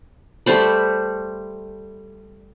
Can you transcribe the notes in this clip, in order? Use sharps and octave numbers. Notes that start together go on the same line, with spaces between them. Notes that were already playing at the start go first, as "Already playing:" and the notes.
G3 A3 C5 B5